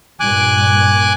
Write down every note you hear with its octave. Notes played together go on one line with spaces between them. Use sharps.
G2 A#2 G#5 D6 F#6